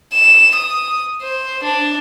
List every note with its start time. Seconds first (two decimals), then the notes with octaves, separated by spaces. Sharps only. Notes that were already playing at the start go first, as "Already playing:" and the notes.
0.14 E7
0.55 D#6
1.22 C5
1.63 D4